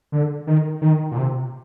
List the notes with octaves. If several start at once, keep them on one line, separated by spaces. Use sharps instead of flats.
D3
D#3
D#3
A#2
C3